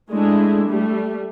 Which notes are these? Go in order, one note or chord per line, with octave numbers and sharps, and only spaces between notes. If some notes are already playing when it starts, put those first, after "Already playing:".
G#3 A3 D4 E4
G3 A3